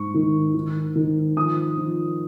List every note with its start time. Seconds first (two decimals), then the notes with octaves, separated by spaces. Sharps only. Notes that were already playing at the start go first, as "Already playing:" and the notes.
Already playing: G#2 C#6
0.14 D#3
0.54 D#3
0.96 D#3
1.37 F3 D#6
1.77 F3